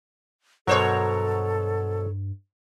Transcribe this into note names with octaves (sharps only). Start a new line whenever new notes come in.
G2 B2 F#3 A4 A#4 C5 C#5